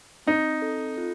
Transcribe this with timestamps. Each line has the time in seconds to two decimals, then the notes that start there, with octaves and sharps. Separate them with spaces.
0.27 C4 D#4
0.62 A4
0.98 F4